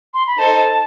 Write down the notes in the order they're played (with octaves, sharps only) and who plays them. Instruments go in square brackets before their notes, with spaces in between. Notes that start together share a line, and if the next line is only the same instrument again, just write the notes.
[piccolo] C6
B5
[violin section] D#4 A4 C5 [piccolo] A5